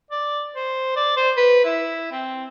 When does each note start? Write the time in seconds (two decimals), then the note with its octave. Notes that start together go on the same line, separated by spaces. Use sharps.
0.11 D5
0.55 C5
0.96 D5
1.17 C5
1.37 B4
1.65 E4
2.12 C4